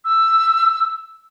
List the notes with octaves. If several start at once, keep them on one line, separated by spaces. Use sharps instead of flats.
E6